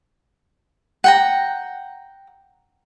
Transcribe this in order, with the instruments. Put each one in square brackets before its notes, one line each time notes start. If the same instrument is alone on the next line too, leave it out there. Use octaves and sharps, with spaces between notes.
[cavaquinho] F#5 G5 A#5